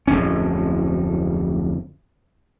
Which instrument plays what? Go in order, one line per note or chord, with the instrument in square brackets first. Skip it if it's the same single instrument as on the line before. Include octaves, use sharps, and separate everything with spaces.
[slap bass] D1 F2 A2 C#4